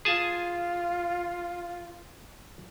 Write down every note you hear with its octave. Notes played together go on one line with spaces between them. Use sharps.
F4 G#4 G#5 A5